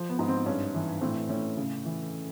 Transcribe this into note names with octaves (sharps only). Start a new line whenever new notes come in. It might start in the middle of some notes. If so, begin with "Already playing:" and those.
Already playing: F3
B3
G#2
C4
G2 C#4
E3
A2 C4
A2 C#4
C#3
E3